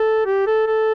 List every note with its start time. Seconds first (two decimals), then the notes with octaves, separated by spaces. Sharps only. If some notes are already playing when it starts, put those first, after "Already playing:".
Already playing: A4
0.26 G4
0.47 A4
0.67 A4